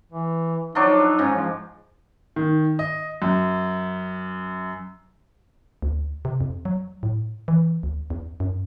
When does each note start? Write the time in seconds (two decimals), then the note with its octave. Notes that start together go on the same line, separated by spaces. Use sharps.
0.12 E3
0.75 F3 F#3 D4 D#4
1.19 G#2 C#4
1.36 F3
2.36 D#3
2.79 D#5
3.22 F#2
5.82 D2
6.25 C3
6.41 F2
6.65 F#3
7.03 A2
7.48 E3
7.83 D2
8.10 E2
8.40 F#2